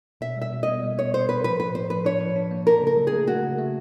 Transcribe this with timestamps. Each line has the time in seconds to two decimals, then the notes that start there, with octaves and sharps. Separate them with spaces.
0.21 B2 E5
0.36 G3
0.42 E5
0.53 B2
0.63 B3 D#5
0.83 G3
0.98 B3 C#5
1.13 B2 C5
1.29 B3 B4
1.44 F3 B4
1.59 A2 B4
1.74 A2 C5
1.90 F3 B4
2.05 D4 C#5
2.21 F3
2.36 D4
2.51 A#3
2.67 D4 A#4
2.82 C#3
2.87 A#4
2.97 F#3
3.07 G#4
3.13 A3
3.27 A3 F#4
3.43 C#3
3.58 A3